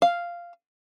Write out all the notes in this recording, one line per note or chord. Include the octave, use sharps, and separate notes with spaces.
F5